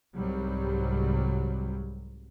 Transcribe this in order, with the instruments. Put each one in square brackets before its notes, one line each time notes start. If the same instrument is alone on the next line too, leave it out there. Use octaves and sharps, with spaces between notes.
[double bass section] C2 G#2 C3 F#3 G3